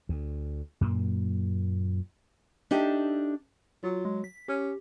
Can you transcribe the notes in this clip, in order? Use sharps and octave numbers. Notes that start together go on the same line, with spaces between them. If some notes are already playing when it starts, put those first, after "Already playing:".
D2
F#2 A#2 A#3
D4 D#4 G4 A4 E5
F#3 F4
G#3
B6
C#4 G4